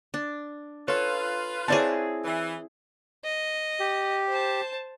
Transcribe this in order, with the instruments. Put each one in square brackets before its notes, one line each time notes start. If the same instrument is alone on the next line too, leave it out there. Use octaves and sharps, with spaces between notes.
[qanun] D4
[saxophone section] F4 B4 [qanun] A4 [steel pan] C#5
[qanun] C4 E4 G#4 [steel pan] C#5 D5 A5
[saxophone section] E3
[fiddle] D#5
[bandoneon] G4
[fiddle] C5 A5